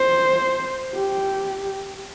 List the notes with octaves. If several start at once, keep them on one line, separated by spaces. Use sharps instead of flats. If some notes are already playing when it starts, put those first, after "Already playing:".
Already playing: C5
G4